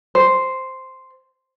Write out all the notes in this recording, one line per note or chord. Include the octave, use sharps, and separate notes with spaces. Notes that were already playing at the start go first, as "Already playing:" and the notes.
C5